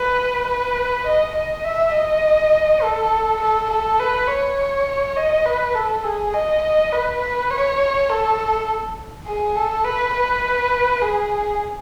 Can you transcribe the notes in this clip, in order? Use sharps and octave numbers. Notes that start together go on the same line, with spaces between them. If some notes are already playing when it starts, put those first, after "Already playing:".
Already playing: B4
B4
D#5
D#5
E5
D#5
A4
A4
A4
B4
C#5
D#5
B4
A4
G#4
D#5
D#5
B4
B4
C#5
A4
G#4
A4
B4
B4
G#4